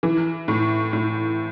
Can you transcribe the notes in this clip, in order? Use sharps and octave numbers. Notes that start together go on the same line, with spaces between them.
E3
A2
A2